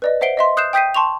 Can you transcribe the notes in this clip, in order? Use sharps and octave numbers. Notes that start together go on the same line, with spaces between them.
B4 D5 D#5
C5 E5 F#5 C7 D7 G7
D#5 E5 C6
D#6 F#6 G6 C7 E7
G5 D#6 G6 B6 C7 D#7
A5 C6 C#6 F7